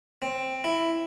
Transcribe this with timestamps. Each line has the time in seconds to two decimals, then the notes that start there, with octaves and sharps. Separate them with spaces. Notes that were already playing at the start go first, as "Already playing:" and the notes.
0.22 C4
0.64 E4